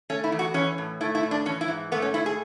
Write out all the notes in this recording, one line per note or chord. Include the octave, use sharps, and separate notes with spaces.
A3 C#4
E4
E2
F#4
E3 C#4
A2
A3 E4
E4
A2
D4
E3 C#4
E4
G#2
A3 B3
C#4
G#2 E4
G#4